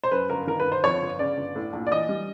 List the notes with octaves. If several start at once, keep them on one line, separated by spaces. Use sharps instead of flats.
C5
F#2 B4
G1 A#4
D#3 A#4
B4
G1
C5
F2 C#5
G1
C#3 D5
G1
A2
A#1
D5
E3 D#5
G3